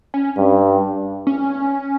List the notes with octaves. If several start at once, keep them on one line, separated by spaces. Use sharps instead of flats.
C#4
G2
C#4